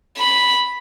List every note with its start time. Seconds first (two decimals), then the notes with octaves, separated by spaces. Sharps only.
0.17 B5